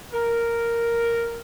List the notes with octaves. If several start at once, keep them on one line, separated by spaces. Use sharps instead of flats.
A#4